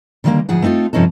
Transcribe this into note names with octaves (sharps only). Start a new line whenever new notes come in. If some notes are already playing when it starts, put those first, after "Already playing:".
D3 D#3 G3 A3 A#3
D2 G#2 F3 G#4 F#5
A3 C4 D#4 F4 A4
G2 C3 F3 C#4 D#4 A4